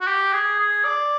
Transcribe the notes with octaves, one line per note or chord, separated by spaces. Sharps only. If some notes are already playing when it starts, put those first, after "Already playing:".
F#4
G4
G#4
G#4
D5